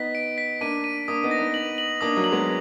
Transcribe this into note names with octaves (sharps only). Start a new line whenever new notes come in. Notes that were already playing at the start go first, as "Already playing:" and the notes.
Already playing: B3 D#4 B6
D7
B6
A#3 D4 D#7
D#7
A#3 D4 D#6
B3 D#4
A#6
B3 D#4
F#7
F#7
A#3 D4 D#6
F#3 A#3
F#7
G#3 B3